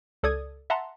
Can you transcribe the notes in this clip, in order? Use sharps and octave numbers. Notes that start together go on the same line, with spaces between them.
C#2 A4 D5 D#6 G#6
E5 F#5 A5 A#5 C6